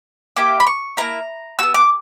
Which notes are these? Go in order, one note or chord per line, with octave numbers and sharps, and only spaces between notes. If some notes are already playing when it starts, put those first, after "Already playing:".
A#3 E4 G4 D6
B5
C#6
A#3 C#4 E4 A#5
B3 F#4 E6
D6